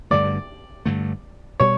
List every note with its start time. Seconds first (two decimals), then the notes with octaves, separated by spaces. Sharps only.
0.11 G2 D3 A3 D5
0.86 G2 D3 A3
1.60 B2 G3 C#5